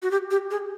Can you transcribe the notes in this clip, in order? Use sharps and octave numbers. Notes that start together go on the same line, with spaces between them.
F#4
G4
G4
G#4